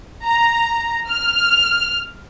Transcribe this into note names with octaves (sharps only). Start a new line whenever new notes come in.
A#5
F6